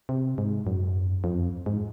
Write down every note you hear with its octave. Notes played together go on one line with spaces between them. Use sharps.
C3
G#2
F#2
F2
G#2